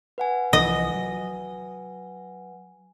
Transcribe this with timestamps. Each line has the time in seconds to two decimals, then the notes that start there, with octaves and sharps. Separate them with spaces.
0.18 B4 F#5 G#5
0.53 C2 E3 F3 D#5
0.94 F#3